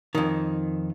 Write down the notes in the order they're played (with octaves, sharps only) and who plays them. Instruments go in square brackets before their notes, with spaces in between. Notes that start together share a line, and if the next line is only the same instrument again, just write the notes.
[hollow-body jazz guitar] F2 D#3